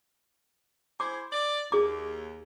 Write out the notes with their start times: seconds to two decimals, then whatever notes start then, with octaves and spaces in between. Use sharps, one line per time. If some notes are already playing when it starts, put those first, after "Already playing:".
1.00 E4 G#4 C5 D6
1.32 D5
1.72 D#2 G#4 D6